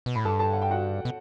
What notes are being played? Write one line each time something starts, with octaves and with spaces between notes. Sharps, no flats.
B2
A2 B5
G2 A4 A5
A4 A5
F#5
G5
F#4 F#5
B2